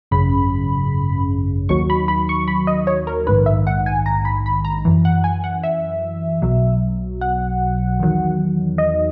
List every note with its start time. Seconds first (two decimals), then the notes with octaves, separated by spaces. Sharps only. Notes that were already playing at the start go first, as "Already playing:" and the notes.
0.11 G#1 F#2 C#3 B5
1.69 D#2 D#3 F#3 C#6
1.90 B5
2.08 B5
2.29 C#6
2.48 B5
2.67 D#5
2.87 C#5
3.07 A#4
3.27 A#1 G#2 D#3 B4
3.46 E5
3.67 F#5
3.86 G#5
4.06 A#5
4.25 B5
4.46 B5
4.65 A#5
4.85 F#2 E3
5.05 F#5
5.24 G#5
5.44 F#5
5.63 E5
6.42 B1 B2 F#3
7.21 F#5
7.99 E2 D#3 F#3
8.78 D#5